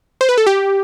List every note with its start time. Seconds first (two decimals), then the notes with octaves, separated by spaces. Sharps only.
0.21 C5
0.29 B4
0.38 A4
0.47 G4